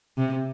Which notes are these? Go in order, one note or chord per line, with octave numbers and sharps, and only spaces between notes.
C3